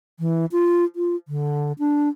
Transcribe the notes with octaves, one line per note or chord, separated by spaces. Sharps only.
E3
F4
F4
D3
D4